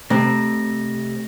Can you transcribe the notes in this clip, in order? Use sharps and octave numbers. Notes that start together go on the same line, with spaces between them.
C3 A3 C4 A#6